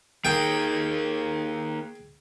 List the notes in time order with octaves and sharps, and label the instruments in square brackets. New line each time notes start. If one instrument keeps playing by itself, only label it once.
[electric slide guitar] A#3 D#4 A#4 [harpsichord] G#4 G5